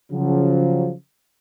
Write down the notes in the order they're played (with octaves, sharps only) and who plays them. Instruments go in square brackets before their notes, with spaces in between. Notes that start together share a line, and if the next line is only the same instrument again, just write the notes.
[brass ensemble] C#3 F3 F#3